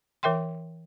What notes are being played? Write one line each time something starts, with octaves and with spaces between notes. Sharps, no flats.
E3 A#4 E5 G5 C6